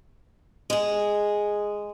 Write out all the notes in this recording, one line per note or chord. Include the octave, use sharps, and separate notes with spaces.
G#3 G#4